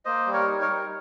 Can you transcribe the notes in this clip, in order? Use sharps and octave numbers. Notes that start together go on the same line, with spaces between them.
A#3 C5 D#5
G3
A#4 C#5
D#4
A#4 C#5
G3